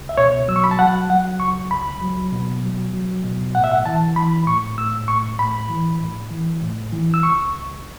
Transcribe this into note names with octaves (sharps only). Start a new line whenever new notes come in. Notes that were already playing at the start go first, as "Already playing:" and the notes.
Already playing: C#2
E5
B2 C#5
F#3 E6
C#6
B5
A5
F#3 F#5
F#3 F#5
C#2 C#6
C#2 B5
F#3
B2
F#3
F#3
B2
A2 F#5
E5
F#5
E3 A5
E3 B5
A2 C#6
A2 E6
A2 C#6
A2 B5
E3
A2
E3
A2
E3
E6
C#2 C#6
C#2